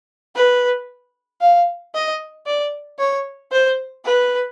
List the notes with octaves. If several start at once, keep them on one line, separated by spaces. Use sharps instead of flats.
B4
F5
D#5
D5
C#5
C5
B4